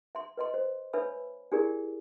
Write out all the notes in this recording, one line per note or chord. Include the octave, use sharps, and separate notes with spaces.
E5 C6
B4 D#5 C6
C5
D4 B4 C#5 E5 B5 E6
D4 E4 G4 G#4 A#4 D5